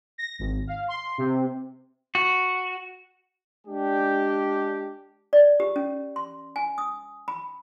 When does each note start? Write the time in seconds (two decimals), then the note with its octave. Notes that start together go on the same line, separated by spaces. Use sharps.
0.18 A#6
0.39 G#1
0.67 F5
0.88 C6
1.18 C3
2.15 F#4
3.67 G#3 D4 G4
5.33 D5
5.60 G4
5.76 C#4
6.16 C6
6.56 G#5
6.78 D#6
7.28 B5